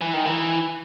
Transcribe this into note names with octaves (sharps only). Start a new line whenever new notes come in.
E3
D#3
E3